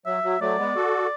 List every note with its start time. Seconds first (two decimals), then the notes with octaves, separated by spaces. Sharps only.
0.06 F#3 E5
0.23 F#3
0.41 F#3 A3 D5
0.58 G#3 B3
0.75 F#4 A4